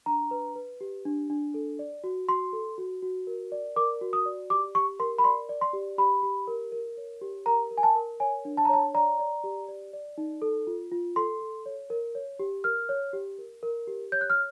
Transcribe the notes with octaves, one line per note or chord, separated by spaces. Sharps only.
D4 A#5
B4
B4
G4
D4
D4
A4
D5
F#4
F#4 C6
A4
F#4
F#4
A#4
D5
A#4 D6
F#4
D#6
D5
G4 D6
G4 C#6
A#4 C6
B5
D5 C6
D5
C6
G4
G4 B5
G4
A#4
A#4
C#5
G4
A#4 A#5
A#4
G#5
A5
A#4
C#5 G#5
D4
A5
A#5
C#5 A5
D5 A#5
D5
G4
D5
D5
D#4
A4
F4
F4
A4 C6
A4
C#5
A#4
C#5
G4
A#4 F6
C#5
G4
A#4
A#4
G4
C#5 G6
F#6
F6